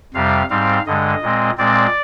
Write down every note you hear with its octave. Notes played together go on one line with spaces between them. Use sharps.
F2 C3 G3 F5
G#2 G3 C4 F5
G2 D3 G#3 D#5
A#2 G#3 C4
A#2 G#3 C4 D5